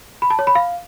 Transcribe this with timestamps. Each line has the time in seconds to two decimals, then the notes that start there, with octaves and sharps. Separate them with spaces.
0.22 B5
0.30 A5
0.39 C#5
0.47 B5
0.55 F5